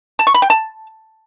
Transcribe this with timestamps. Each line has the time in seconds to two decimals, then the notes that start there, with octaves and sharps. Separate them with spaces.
0.19 A5
0.27 C#6
0.34 B5
0.42 G5
0.50 A5